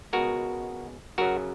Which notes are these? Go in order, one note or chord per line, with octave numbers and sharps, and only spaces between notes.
C#2 B2 G#3 F#4 A#4
F#2 C#3 F#3 F#4 A#4